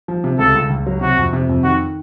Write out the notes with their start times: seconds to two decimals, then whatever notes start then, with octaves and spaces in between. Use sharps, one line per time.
0.08 F3
0.24 C3
0.39 C#2 A4
0.55 C#2
0.70 C#2
0.87 F#3
1.01 C3 F#4
1.18 F2
1.33 C3
1.49 F2
1.64 D#3 F#4